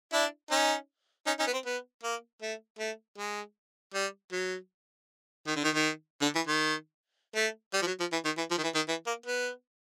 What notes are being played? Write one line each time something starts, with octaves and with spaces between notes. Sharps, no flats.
D4 E4
C#4 D#4
C#4 D#4
C#4 D#4
B3
C4
B3
A#3
A3
A3
G#3
G3
F#3
D#3
D3
D#3
D#3
D3
E3
D#3
A3
G3
F3
F#3
F3
E3
D#3
E3
F3
D#3
E3
D#3
E3
A#3
B3